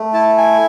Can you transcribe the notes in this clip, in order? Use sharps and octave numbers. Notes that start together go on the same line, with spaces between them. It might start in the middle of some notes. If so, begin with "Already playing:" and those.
Already playing: A3
E4 A5
G#5